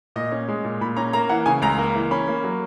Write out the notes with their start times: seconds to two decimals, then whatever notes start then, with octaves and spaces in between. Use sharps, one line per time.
0.16 A#2 D#5
0.32 C#4
0.48 G#3
0.64 A#2
0.81 A#2 B5
0.97 C#4 A#5
1.13 A#3 A#5
1.29 E3 F#5
1.46 C#3 G#5
1.62 C#2 A#5
1.78 A#3
1.95 E3
2.11 C#4 B5
2.27 A#3
2.44 F#3